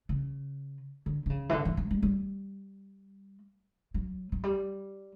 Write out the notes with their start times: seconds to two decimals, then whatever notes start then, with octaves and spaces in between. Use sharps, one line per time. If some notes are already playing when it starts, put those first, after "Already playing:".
0.09 C#3
1.06 D3
1.26 D3
1.30 C#3
1.49 E3
1.53 D3
1.65 E3
1.77 F#3
1.91 G3
2.02 G3
3.94 F#3
4.32 F#3
4.44 G3